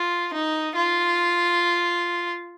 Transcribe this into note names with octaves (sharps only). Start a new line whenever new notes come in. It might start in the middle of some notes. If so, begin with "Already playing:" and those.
Already playing: F4
D#4
F4